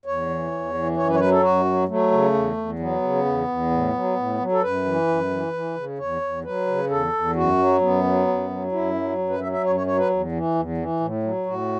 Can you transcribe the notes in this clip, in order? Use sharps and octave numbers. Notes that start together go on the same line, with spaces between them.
E2 C#5
E3
E2
E3
F#2 C#5
B4
C#5
F#3 B4
A4
F#2 F#4
F#3
F#3 A3
C#3
E2
E2
F#3 B3
C#3
E2
E2
A2
F#3
A2
F#3
A4
F#2 B4
E3
F#2
E3
E3
C#3
E2 C#5
E2
F#3 B4
C#3
E2 A4
E2
F#2 F#4
F#3
F#2 B3
F#3
F#2
F#3
F#2 E4
F#3
F#2
B4
F#3 E5
E5
F#2 C#5
C#5
F#3 C#5
B4
E2
E3
E2
E3
A2
F#3
A2 F#4